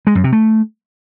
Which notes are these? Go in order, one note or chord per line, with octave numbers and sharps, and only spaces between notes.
G#3
F#2
C3
A3